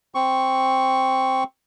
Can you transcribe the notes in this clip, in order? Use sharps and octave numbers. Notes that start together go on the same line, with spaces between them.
C4 C#6